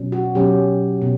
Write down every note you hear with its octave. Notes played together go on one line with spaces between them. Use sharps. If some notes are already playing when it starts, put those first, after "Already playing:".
Already playing: B2 F#3 C#4
F#4
B2 F#3 C#4 G4
B2